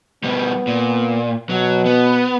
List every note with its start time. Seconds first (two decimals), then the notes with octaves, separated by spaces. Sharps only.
0.24 B2 G3 B3
0.67 A#2
1.50 B2 F#3
1.86 B3